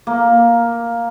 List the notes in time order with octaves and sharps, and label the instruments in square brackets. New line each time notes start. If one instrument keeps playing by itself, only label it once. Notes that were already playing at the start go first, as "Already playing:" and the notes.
[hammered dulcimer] A#3